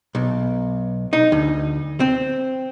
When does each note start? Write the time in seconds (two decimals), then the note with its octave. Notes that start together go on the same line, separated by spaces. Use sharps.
0.15 B1
1.13 D#4
1.32 D2
2.00 C4